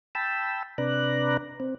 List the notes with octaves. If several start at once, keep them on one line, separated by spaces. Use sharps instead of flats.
G5 A5 B5 E6
C3 D4 B4 D5 A#5 F#6
C4